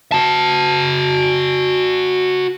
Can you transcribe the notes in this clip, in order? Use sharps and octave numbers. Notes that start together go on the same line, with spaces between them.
F#4 A5